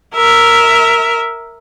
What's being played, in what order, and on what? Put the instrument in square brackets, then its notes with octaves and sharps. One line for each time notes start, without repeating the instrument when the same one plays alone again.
[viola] A#4 E5